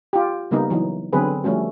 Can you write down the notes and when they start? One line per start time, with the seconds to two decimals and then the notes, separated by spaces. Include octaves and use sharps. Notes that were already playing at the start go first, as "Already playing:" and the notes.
0.13 F4 G4
0.51 C#3 G3 A#3 B3 D#4
0.70 E3 F#3 D#4
1.13 D3 F#3 B3 C4 G#4 B4
1.44 F3 G3 A3 C#4 F#4